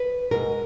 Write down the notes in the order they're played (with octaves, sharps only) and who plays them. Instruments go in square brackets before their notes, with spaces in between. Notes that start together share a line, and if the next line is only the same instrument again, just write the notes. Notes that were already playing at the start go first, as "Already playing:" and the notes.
Already playing: [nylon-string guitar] B4
B2 G#3 B3 A#4